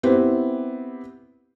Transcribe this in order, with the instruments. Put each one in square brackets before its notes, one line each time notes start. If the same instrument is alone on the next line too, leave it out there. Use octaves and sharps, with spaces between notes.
[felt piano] B3 C4 E4 G4